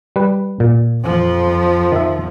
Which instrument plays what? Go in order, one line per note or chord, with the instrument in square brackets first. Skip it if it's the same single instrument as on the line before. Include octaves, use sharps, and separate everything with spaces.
[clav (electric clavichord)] G3 B4
A#2
[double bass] F2 F3
[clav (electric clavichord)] D#3 E5